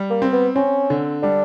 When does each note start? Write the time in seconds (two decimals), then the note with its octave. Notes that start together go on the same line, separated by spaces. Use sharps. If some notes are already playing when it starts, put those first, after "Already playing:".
Already playing: G3
0.10 A#3
0.22 C4
0.32 B3
0.56 C4 C#4
0.90 D3
1.23 G3 D4